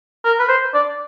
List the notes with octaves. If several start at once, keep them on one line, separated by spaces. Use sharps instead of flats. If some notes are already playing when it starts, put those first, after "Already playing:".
A#4
B4
C5
D5